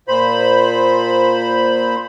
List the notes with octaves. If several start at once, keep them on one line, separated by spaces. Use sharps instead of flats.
A#2 C5 B5